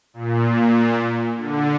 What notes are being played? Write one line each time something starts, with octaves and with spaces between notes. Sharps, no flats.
A#2
D3